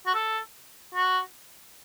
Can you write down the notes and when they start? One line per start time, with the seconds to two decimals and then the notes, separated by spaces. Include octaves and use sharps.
0.06 F#4
0.14 A4
0.95 F#4